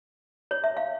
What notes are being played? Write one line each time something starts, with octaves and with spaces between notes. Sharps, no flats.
C#5
E5
F5